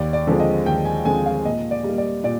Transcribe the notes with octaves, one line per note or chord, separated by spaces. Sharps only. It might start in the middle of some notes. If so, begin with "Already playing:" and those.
Already playing: D#2 D5
D5
D3 F3 G#3 C4
D#5
D#2 G5
G#5
D3 F3 G#3 C4 G#5
F5
A#2 D#5
D5
G3 A#3
D5
A#2 D5